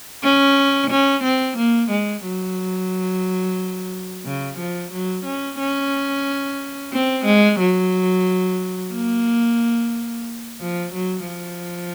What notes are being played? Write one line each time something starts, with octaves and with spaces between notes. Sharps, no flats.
C#4
C#4
C4
A#3
G#3
F#3
C#3
F3
F#3
C#4
C#4
C4
G#3
F#3
A#3
F3
F#3
F3